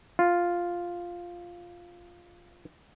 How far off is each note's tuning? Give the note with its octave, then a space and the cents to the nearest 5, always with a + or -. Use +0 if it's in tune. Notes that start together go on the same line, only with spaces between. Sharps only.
F4 +0